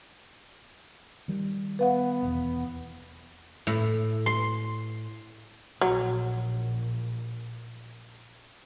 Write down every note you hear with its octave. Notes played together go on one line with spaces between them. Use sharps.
D#3 G3
B3 B4 F5 F#5
E1 E2
A2
C6
A#1 F#3